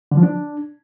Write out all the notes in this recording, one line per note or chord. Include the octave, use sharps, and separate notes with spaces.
D3
F3
D4